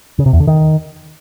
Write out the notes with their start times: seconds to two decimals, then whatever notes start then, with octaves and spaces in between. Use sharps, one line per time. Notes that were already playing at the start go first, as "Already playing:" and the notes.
0.19 C#3
0.26 C3
0.33 E2
0.40 D3
0.47 D#3